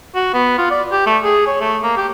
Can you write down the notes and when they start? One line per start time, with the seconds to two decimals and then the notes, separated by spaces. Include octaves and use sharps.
0.15 F#4
0.34 B3
0.58 F4
0.71 D5
0.92 G4
1.06 A3
1.24 G#4
1.47 C#5
1.61 A3
1.83 A#3
1.97 G4